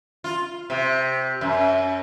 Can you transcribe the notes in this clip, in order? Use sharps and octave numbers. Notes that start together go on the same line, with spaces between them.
F4
C3
F#2